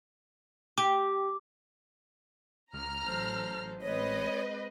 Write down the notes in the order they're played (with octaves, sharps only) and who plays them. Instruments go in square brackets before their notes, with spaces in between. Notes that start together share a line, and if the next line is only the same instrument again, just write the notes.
[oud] G4 [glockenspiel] D6
[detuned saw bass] C#2 [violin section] A#5 F6
[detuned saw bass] A1 [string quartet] F#3 A4 C5
[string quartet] G#3 C4 [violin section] B4 D#5 [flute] C#5